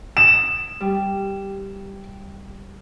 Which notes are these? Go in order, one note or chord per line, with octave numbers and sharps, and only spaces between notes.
D#6 E7
G3